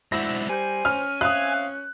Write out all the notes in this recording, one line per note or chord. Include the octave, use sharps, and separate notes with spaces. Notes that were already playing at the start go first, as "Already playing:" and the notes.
G#2 D4 E4 F#4 C5 E5 A#6
G3 C5 G#5
C#4 F6
C4 E5 F5 D#6 F#6